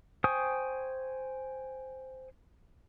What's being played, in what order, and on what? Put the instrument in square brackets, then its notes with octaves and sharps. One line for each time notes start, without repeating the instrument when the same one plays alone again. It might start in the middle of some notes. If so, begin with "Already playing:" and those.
[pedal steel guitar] C5 G5 G#5 C#6 D#6